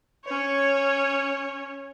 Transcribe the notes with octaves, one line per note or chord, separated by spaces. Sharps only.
C#4 C#5